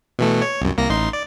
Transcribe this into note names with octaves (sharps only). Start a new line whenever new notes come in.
B2 E3 A3
C#5
C2 F#2
C2 A#3 A#6
A1 D#4 C6
D5